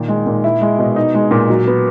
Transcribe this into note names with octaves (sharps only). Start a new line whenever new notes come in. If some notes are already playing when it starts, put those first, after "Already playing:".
Already playing: A#2 D#3
G#3
A#2
E4
G#3
B2
D#4
G#3
A#2
F#3
B3